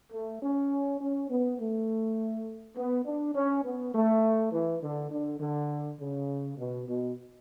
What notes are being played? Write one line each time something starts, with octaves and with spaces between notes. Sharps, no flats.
A3
C#4
C#4
B3
A3
B3
D4
C#4
B3
A3
E3
D3
D3
D3
C#3
B2
B2